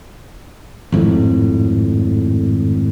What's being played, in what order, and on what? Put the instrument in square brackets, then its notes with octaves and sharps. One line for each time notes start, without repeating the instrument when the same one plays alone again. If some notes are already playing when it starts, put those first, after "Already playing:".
[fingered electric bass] G#1 F2 A2